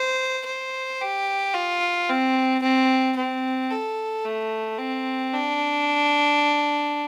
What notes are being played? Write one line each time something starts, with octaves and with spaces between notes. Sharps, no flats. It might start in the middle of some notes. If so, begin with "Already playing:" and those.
Already playing: C5
C5
G4
F4
C4
C4
C4
A4
A3
C4
D4